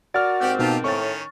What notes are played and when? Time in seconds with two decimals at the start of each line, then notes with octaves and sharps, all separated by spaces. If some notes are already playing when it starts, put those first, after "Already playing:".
0.14 F#4 A#4 D5 F6 A6
0.40 G#2 A#3 C4 G4 D5 F#5
0.59 B2 D#4 F4 G4 A5
0.84 A2 D#3 C#4 C#6 A6